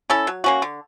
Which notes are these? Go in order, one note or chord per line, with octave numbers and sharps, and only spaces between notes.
C#4 E4 A4
F#3
A#3 C#4 F#4
D3